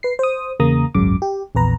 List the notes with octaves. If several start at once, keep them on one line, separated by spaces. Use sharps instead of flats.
B4 C7
C5 D#6
E2 C#3 A#3 A#5 D#6
G#1 C#2 F#2 C#3 D6
G4
A#1 E2 B4 A#5